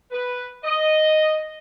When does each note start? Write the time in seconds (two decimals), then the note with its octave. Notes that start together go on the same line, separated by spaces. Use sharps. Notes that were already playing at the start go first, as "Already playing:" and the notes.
0.12 B4
0.64 D#5